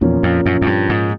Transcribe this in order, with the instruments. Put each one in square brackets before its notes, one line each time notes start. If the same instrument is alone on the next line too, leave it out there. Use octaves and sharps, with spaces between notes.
[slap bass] E2 [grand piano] A#2 F3 A#3 C#4
[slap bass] F2
F#2
F#2
G2
G#2